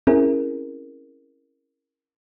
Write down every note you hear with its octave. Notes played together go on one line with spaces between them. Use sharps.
C4 C#4 E4 G#4 A#4